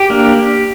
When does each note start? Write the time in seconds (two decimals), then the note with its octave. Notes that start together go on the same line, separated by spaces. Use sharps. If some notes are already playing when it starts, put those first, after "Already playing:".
Already playing: G4
0.10 A#3 D4